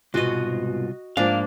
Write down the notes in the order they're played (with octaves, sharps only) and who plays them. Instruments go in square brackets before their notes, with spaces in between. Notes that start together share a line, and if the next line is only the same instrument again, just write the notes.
[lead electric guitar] C2 F4 [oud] G#2 B2 [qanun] F#4 D#5
[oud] G#2 [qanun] F3 A#3 D4 [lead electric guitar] F5